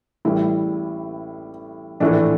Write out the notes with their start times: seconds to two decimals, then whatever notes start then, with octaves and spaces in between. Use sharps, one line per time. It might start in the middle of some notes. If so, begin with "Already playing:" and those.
0.25 A1 A2 G3 E4
2.00 A#1 A2 E3 A3 D4